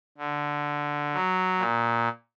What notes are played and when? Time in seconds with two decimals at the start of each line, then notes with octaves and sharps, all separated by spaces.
0.18 D3
1.13 F#3
1.59 A#2